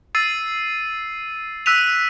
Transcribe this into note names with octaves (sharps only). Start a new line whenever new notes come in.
E6 A6 C7 D#7
E6 F#6 B6 D#7 F7